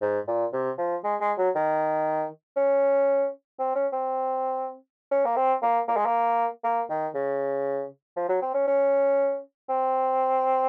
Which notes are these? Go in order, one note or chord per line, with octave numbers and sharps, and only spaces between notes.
G#2
A#2
C3
F3
G#3
G#3
F#3
D#3
C#4
C4
C#4
C4
C#4
A#3
C4
A#3
A#3
G#3
A#3
A#3
D#3
C#3
F3
F#3
C4
C#4
C#4
C4